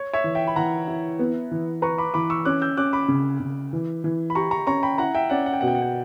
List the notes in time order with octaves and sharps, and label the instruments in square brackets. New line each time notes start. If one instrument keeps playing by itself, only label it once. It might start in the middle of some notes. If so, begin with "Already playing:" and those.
Already playing: [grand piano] C#5
C#5 E5
[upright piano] E3
[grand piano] E5 G5
B5
[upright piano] E3 [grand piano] F#5 A#5
[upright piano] E4
B3
E3
[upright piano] B4 [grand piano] A#5 C#6
[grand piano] B5 D6
[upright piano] E3 [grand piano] B5 D6
[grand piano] C#6 E6
[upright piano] C#4 [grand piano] D6 F#6
[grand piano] E6 G6
[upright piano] C#4 [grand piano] D6 F#6
[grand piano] B5 D6
[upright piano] C#3
C#3
E3
E3
[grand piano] B5
[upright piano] G4 [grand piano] A#5 C#6
[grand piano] A#5 C#6
[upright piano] C#4 [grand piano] A#5 C#6
[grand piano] G5 B5
[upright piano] E4 [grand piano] F#5 A#5
[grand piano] E5 G5
[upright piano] C#4 [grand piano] D5 F#5
[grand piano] F#5
G5
[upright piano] B2 [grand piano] F#5
[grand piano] G5
F#5
G5